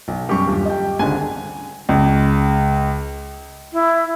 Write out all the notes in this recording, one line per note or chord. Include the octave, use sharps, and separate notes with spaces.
B1
F#2 G3 G4 C#6
D#1 G2
D#5 G5
G#1 C#2 D3 G#5
C#2
E4